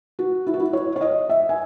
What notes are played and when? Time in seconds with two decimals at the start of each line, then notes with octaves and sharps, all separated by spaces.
0.19 F#4
0.47 E4
0.54 F#4
0.60 E4
0.73 C#5
0.96 C#5
1.01 D#5
1.29 E5
1.49 G#5